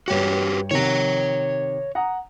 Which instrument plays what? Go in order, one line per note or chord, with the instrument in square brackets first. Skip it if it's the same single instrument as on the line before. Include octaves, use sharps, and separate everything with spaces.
[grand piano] G2 C#5 G5 [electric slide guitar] F#4 G4 B4
[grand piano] C3 D#3 [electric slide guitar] C#5 A#5
[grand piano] F#5 A#5 D#6